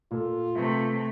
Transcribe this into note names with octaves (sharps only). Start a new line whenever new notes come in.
A#2 F4 A4
C3 A3 A4 B4 E5